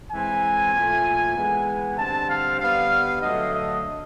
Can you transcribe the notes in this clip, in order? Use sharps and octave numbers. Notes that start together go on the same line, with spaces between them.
E3 G#3 C4 G#5
A#2 F3 A3
E3 G#3 B3
D3 G3 C4 A5
F5
D3 G3 B3 F5
D3 F#3 A3 D#5
D#5